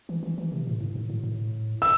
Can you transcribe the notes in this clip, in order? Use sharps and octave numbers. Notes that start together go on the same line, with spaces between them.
E3
E3
E3
C3
A2
G#2
A2
A2
A2
E6